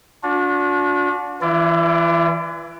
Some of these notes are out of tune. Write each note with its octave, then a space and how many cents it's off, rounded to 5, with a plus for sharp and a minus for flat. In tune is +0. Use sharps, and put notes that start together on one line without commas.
D4 -20 F#4 -45
E3 +0 E4 +45 D5 +0